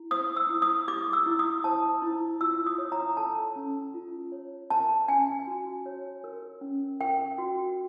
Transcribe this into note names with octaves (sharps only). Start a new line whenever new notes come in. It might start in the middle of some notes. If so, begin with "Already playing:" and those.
Already playing: E4
C5 D#6
E6
E4
D#6
G4 D6
E6
E4
D#6
C5 A5
E4
F4 E6
D#6
C#5
A#5
A4 A5
C#4
F4
C#5
A#4 A5
C#4 G#5
F#4
C#5
A#4
C#4
A#4 G5
F#4